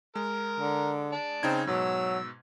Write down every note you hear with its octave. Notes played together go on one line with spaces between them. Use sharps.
G#3 A#4
D3
D5 A5
C#3 C4 D#4 G#6
G#2 B2 F#3 E6